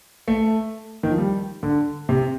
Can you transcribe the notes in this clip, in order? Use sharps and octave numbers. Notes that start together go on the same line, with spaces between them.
A3
D#3
F3
G3
D3
C3